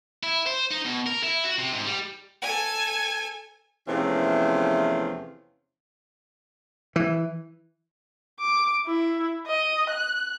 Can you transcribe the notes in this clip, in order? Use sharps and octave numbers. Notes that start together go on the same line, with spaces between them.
E4
C5
D#4
B2
A#4
E4
F#4
C3
G#2
G3
A4 G#5
E2 C3 E3 F3 A3 C#4
E3
D6
E4
D#5
F#6